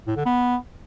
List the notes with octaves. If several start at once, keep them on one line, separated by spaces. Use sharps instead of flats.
A2
D3
B3